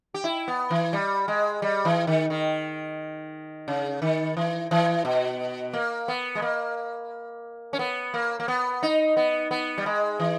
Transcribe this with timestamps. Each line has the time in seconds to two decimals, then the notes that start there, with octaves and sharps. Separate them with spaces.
0.14 G4
0.24 E4
0.48 B3
0.70 E3
0.93 G3
1.28 G#3
1.62 G3
1.85 E3
2.07 D#3
2.30 D#3
3.68 C#3
4.02 D#3
4.37 E3
4.71 E3
5.05 B2
5.73 A#3
6.08 B3
6.35 G#3
6.42 A#3
7.73 C#4
7.79 B3
8.14 A#3
8.40 A#3
8.48 B3
8.83 D#4
9.17 B3
9.51 B3
9.78 G3
9.86 G#3
10.20 E3